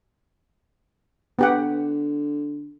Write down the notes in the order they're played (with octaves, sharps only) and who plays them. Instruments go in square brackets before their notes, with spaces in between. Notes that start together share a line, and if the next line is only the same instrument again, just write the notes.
[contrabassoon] D3 [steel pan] B3 G4 F#5